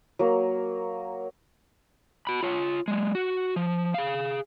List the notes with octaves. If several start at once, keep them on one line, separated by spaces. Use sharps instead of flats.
F#3 A#3
F#4 B5
F4 C#5
F#3 G#3
F#4
F3
G#4 F5